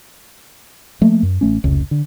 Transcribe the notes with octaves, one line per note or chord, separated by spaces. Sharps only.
F3 A3 A#3
F#2
A1 A3 C#4
F1 C#2
D3